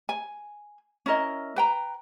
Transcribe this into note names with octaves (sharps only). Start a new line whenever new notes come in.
G#5
C#4 E4 A#4 D#5
B4 G5 A#5